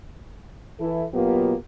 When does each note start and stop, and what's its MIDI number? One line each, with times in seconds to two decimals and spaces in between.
0.80 1.04 52
0.80 1.04 64
0.80 1.04 69
1.13 1.53 47
1.13 1.53 54
1.13 1.53 58
1.13 1.53 59
1.13 1.53 65
1.13 1.53 67